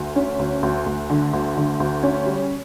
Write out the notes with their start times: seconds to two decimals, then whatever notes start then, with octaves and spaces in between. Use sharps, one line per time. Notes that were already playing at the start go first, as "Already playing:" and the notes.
Already playing: D2
0.16 C#4
0.39 D2
0.63 D2
0.86 D2
1.10 D3
1.33 D2
1.57 D3
1.80 D2
2.03 C#4
2.26 G3